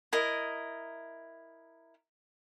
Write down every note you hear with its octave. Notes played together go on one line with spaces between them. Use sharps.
E4 A#4 D#5